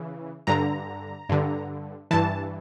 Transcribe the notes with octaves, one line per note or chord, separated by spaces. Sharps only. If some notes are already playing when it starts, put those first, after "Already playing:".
Already playing: C#3 E3
G2 D3 A#5
G2 D3
G2 E3 A5